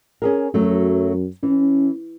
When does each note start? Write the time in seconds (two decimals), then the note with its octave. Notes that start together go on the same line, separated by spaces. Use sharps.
0.22 C#4 G#4 A#4
0.54 F#2 F#3 A3
1.43 E3 C#4